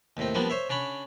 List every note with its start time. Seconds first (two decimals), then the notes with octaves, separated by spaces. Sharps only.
0.17 D#2 A2 C4
0.35 F3 G3 A#3 B3 D4
0.50 C5 C#5 E5
0.70 C#3 D4 C#5 B5